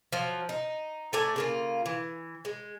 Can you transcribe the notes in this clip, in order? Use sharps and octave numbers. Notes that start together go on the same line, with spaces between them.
F3 F#3
D#4
A3 D5 G#5 A#5
C#3 A#3 F4
E3
G#3